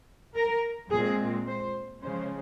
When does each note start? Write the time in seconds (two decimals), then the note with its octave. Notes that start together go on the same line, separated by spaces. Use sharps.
0.36 A#4
0.90 A#2 G#3 C4 G#4
1.47 C5
2.02 C#3 F3 G#3 C#4 C5